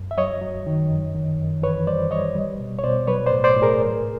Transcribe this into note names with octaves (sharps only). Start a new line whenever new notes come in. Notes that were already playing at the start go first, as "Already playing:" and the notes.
Already playing: F#2
E5
F#3 C#5 D#5
F#3
D#3
F#2
D#3
F#2
E3 B4 C#5
G3 C5 D5
G3 C#5 D#5
G3
B2
C#5
B2 C5 D5
F#3 B4 C#5
C5 D5
A2
C5 D5
A2
G#4 A#4
G#2